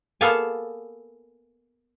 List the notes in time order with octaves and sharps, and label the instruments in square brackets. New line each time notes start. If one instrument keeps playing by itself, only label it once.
[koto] A#3 B3 G#4 A4 F5 G#5